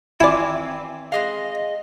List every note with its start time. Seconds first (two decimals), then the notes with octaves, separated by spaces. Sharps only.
0.21 D#3 E3 C4 E4 F4 D5 G#5
1.12 G#3 G#4 D#5 F5